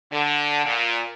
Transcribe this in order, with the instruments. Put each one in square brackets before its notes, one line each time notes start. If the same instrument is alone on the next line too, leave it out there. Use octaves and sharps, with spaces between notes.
[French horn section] D3
A#2